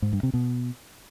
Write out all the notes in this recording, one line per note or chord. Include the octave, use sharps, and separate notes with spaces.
G#2
G2
C3
B2